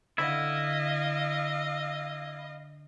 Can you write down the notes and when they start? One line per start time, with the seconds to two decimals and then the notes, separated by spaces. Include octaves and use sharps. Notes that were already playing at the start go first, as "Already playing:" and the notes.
0.18 D3 E4 D#5 F5